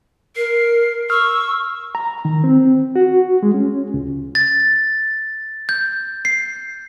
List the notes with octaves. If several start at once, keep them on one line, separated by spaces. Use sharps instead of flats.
A#4 C7
C#6 E6 F6
A#5
D#3
C4
F#4
G#3
C#4
C#2
A6
G6
C7